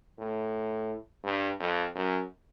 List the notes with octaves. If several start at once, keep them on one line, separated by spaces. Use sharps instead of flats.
A2
G2
F2
F#2